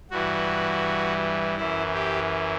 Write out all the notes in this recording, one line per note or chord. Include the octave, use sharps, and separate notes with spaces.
G2 E3 F#4
F#2 E3 E4
G4